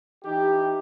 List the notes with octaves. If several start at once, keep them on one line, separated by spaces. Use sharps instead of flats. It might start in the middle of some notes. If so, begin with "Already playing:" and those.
E3 D#4 G4